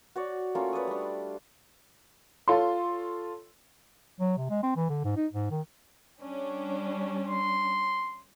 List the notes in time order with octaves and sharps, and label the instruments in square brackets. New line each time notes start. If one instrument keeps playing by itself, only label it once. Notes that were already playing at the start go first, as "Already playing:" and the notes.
[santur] F#4 C#5 D5
A3 A#3 C#4 F4
B4 C#5 D5 D#6
G3 D4
[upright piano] F4 A4 C#5 C6
[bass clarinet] F#3
C3
G#3
C4
E3
D3
G#2
D#4
G#2
D#3
[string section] G3 C#4 D4
[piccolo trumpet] C6